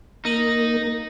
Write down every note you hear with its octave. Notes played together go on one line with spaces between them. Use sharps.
A#3 D#4 A#6 D#7 F#7